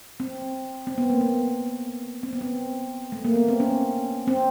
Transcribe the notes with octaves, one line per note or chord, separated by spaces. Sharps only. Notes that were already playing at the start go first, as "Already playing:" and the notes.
C4
C4
B3
A#3
B3
C4
B3
C4
A3
A#3
B3
C4
C#4
C4